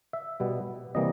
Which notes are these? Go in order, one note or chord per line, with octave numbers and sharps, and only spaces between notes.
E5
B2 G3 B3
C3 E3 G3 A#3 D#5